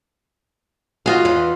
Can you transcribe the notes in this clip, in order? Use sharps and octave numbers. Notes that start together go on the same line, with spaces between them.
F4 F#4 G#4 D#5 F5
E2 E3